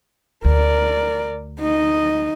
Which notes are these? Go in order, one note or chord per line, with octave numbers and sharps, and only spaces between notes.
D2 A#4 D5
D#4 D#5